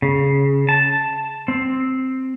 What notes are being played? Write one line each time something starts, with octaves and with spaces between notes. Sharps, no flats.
C#3
A5
C4